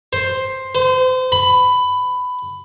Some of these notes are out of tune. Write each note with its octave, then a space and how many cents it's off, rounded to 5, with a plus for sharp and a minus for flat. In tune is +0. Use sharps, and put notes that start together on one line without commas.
C5 +5
C5 -35
B5 +15